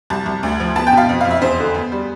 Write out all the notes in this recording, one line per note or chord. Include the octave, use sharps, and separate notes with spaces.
C2 A5
C2
D2
F3
B3 A5
G5
B2
F5
F2
F2 F5
E5
E2 C5
D3
B3
G3